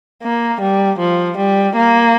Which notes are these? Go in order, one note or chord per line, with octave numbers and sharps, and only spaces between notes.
A#3
G3
F3
G3
A#3